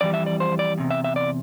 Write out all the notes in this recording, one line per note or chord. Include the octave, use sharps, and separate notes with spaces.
F2 E3 G3 D5
E5
D5
C5
D5
E2 C3
E5
E5
D5